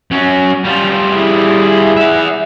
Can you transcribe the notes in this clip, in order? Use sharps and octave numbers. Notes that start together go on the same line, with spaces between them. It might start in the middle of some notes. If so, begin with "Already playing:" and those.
F#3 C#4
G3 F4
E4 G#4
E5 F#5